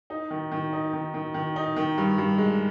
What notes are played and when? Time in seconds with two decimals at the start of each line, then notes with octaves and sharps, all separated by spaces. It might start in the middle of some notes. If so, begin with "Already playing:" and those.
0.10 D#4
0.31 D#3
0.52 D#3
0.73 D#4
0.93 D#3
1.14 D#3
1.34 D#3
1.56 D#4
1.76 D#3
1.98 G2
2.18 G2
2.38 G#3